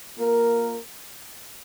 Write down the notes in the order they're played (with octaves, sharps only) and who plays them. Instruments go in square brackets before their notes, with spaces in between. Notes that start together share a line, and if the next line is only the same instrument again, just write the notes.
[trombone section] A#3 F4 A#4